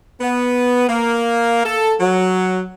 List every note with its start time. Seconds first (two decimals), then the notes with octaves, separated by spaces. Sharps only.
0.21 B3
0.88 A#3
1.64 A4
2.00 F#3